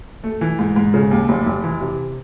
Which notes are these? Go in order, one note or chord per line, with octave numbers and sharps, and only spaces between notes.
A3
E3
G#2
G#2
C#3
D#2
F1
F1
E3
C3